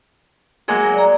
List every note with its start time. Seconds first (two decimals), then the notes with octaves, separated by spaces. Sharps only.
0.68 F#3 G#3 A#3
0.94 D5 A#5